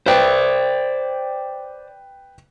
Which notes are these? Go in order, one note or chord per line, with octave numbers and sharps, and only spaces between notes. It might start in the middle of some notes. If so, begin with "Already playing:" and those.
B4 C5 D5 G5